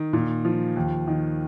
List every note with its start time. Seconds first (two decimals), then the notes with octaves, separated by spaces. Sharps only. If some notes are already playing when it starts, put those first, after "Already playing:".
Already playing: D#3
0.13 A#2
0.45 F3
0.76 D#2
1.07 D#3